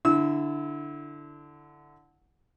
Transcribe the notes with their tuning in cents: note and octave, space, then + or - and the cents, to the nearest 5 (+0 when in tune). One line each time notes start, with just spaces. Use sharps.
D3 +0 E4 +0 E6 -25